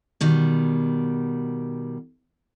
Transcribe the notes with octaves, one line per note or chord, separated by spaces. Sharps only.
B2 D#3 G3